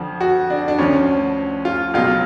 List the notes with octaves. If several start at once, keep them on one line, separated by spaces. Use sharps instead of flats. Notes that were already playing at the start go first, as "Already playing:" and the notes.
Already playing: F2 D3 F3
F#4
D4
D4
D2 D3 F3 C#4
F4
C#2 B2 F#3 F4